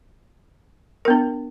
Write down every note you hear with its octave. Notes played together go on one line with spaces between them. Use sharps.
B3 D4 A#4